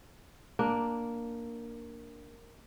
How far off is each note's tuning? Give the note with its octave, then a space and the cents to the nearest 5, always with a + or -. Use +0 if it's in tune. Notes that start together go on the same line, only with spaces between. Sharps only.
A#3 +0 D4 +0